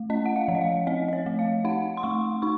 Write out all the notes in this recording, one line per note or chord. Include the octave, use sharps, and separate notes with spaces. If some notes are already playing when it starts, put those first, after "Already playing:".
Already playing: A3
C#4 D#5
F#5
F5
F3
D#5
F5
C4 D#5
D#5
C#5
A3
F5
D#4 F#5
C6
A3 C#6
D#4 C#6